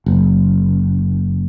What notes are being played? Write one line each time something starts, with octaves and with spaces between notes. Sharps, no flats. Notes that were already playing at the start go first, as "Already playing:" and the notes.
F#1